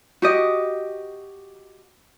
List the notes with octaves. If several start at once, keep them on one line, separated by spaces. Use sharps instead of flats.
F#4 G4 D#5